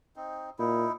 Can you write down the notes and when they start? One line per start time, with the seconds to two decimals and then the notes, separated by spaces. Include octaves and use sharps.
0.16 C4 D#4
0.59 A#2 D#4 E4